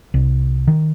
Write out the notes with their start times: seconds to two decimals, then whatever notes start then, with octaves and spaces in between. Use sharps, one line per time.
0.14 C2
0.67 D#3